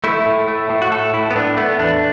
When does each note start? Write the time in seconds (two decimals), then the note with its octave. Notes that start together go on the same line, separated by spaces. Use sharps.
0.04 A3 E4
0.26 A2
0.48 A3
0.70 A2
0.82 F#4
0.92 A3 A4
1.14 A2 E4
1.31 B3
1.36 A2 D4
1.57 A3 B3
1.79 E2 D4